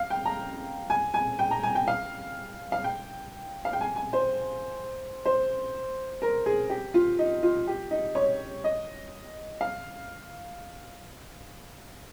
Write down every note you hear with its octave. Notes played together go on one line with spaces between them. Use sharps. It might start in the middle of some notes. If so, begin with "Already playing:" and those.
Already playing: F5
G5
A#5
G#5
G#5
G5
A#5
G#5
G5
F5
F5
G5
F5
G5
G#5
G#5
C5
C5
A#4
G#4
G4
F4
D#4
F4
G4
D#4
C#5
D#5
F5